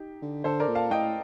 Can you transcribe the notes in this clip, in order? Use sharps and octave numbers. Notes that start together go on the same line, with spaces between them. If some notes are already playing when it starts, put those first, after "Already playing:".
Already playing: D#4 G4
D3
D3 A4 C5
A#4 D5
A#2
F5 A5
A2 D#5 G5